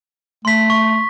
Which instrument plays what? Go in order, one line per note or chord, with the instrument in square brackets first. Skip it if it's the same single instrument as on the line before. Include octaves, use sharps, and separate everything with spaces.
[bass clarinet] A3 [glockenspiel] C6 B6
[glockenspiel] C#6